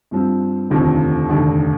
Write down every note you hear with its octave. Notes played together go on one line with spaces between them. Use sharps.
G2 F3 C4
F1 D#2 D3 F3 C4
F1 D#2 D3